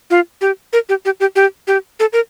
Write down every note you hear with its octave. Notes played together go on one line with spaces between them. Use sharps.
F4
G4
A#4
G4
G4
G4
G4
G4
A4
A#4